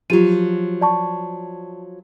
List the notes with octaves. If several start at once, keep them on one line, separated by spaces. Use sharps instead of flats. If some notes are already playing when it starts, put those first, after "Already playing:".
F3 F#3 F4 G4 D#7
D5 A5 C#6